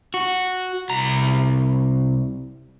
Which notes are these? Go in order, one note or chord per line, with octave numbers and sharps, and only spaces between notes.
F#4
C2 A#5